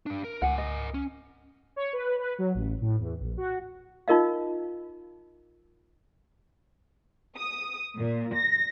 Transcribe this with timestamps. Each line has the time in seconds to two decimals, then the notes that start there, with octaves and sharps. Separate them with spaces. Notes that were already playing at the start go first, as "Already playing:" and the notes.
0.06 G3 D4
0.24 A#4
0.42 C#2 A#4 F#5 G#5
0.58 D#5
0.94 C#4
1.76 C#5
1.93 B4
2.19 B4
2.39 F#3
2.55 A1
2.81 A2
3.00 E2
3.20 A#1
3.37 F#4
4.08 D#4 F4 A#4 D#5 F5
7.37 D#6
7.97 A#2
8.34 A#6